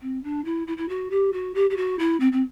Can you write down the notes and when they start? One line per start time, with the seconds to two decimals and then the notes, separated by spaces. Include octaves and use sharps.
0.01 C4
0.23 D4
0.44 E4
0.67 E4
0.77 E4
0.88 F#4
1.10 G4
1.32 F#4
1.54 G4
1.70 G4
1.76 F#4
1.99 E4
2.20 C4
2.32 C4